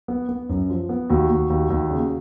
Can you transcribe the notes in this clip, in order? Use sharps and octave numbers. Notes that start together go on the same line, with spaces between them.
B3
B3
F#2
F3
B3
D#2 F#4
D#2
D#2
D#2
C#3